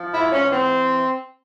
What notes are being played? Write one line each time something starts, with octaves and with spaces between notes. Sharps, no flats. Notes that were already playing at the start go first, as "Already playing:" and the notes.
Already playing: F3
G#2 E4
C#4
E3
C4